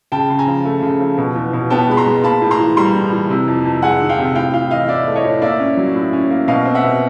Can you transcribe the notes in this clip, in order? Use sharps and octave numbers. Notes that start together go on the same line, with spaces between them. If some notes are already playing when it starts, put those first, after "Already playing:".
C#3 G5 A5
C#3
G#5 A#5
F3
A3
C#3
F3
B2
E2
B2
B3 G5 A5
G#3 B5
A#5 C6
G#3
A#3 A5 B5
A2
A#5 C6
E3
G3 A#5 C6
A2
E3
C3
F2
F2
G#3 F#5 G#5
D#3
F5 G5
C3
A2 F5 G5
A2 F5 G5
E3 D#5 F5
A2 D5 E5
A3
C#5 D#5
A2
A#3 D5 E5
C#4
F#3
A2
C#4
A#3
B2 D#5 F5
C4
E5 F#5
B2